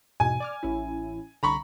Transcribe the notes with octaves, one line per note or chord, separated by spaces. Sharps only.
E2 G#2 B2 G#5
D5 D6 F6
A1 C#4 E4
C2 D3 A#5 B5 C#6